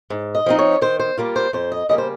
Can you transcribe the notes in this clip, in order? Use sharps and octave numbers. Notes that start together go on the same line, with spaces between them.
G#2
D#5
F3 C4 D#4
C#5
D#3 C5
C5
G3 A#3 F4
C5
F2 C5
D#5
C#3 G3 A#3 D#5
C5